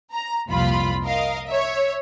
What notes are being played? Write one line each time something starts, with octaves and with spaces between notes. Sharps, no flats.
A#5
C2 F2 A#2 F4 B5
A#4 D#5 F5
C#5 E5